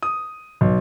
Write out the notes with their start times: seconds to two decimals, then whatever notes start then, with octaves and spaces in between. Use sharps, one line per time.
0.02 D#6
0.61 B1